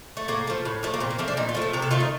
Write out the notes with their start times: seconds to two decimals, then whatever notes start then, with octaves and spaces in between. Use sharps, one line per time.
0.17 A3
0.28 A2 A#3
0.47 F3 A3
0.65 A2
0.83 F3 A3
0.94 A#3
1.00 A#2 C4
1.10 A#3
1.19 F3 A3 C4
1.28 D4
1.37 A#2 D#4
1.49 F4
1.55 F3 A3
1.62 A4
1.73 C3 A#4
1.82 A4
1.91 D#3 A3 F4
2.00 D#4